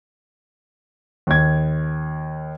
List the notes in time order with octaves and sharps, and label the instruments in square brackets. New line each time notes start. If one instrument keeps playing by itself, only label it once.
[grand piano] D#2 G#6